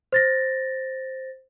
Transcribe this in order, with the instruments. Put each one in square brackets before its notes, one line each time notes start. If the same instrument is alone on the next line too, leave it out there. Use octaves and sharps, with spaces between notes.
[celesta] C5 A6 A#6